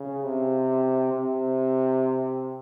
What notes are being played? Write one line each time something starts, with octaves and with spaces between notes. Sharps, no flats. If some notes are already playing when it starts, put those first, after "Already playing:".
Already playing: C#3
C3
C3